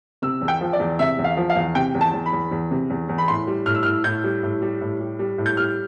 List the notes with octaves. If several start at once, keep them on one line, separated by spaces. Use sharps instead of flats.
C3 E6
E2
G5
F3
D5
E2
C3 E5
E2
F5
F3
F5
E2
C3 G5
E2
A5
E2
B5
E2
E2
C3
E2
E2
B5
A2 C6
G3
A2 F6
E6
A2 F6
A2 G6
G3
A2
G3
A2
G3
G3
A2
G6
G3 F6